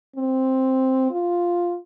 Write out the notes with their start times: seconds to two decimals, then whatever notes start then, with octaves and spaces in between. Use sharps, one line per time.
0.16 C4
1.11 F4